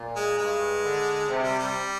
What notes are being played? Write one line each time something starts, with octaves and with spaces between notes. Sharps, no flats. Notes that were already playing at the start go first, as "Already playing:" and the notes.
Already playing: A#2
G#3
G2 G#3
D3
C3
G3
G3